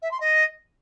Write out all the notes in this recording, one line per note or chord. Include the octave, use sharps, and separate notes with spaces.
E5
C6
D#5